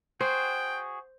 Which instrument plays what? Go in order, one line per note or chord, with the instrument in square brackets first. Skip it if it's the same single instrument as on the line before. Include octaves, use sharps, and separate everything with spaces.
[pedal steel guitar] F#4 G#4 [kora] C5 [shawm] G5